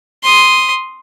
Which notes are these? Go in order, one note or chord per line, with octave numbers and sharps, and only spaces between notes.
C6 D#6